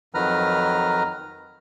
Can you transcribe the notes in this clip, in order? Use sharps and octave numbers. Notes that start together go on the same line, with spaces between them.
F2 D#3 F#3 B4 A#5 F6